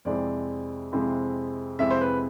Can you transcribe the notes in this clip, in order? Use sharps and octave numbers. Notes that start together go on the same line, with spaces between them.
F2 C3 G#3 C4 E4 D5
F2 C3 G#3 C4 E4
F2 C3 G#3 C4 E4 E5
C5
B4